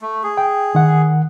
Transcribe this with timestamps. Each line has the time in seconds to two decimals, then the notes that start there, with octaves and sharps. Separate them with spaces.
0.02 A3
0.24 G#4
0.37 G5
0.75 D#3 F#5